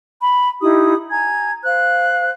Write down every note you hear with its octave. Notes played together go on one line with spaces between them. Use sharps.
B5
D#4 E4 G4 D#6
G#5 A#5 G#6
C5 F5 F#6